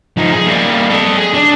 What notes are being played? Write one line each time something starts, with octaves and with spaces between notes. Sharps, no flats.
F3 D#4
G#4
G3 A#3
A4 D#5
G#4
D4